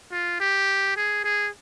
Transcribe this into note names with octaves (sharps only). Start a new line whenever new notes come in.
F4
G4
G#4
G#4